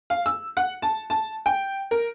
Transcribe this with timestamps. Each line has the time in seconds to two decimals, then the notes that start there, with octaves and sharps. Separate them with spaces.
0.10 F5
0.26 E6
0.57 F#5
0.82 A5
1.10 A5
1.46 G5
1.91 A#4